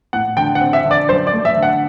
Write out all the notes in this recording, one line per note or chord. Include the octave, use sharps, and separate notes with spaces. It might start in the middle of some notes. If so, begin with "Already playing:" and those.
A2 F#5
D3 G5
F#5
C4
E5
D3
D5
F#2 C5
D5
A3
E5
D3
F#5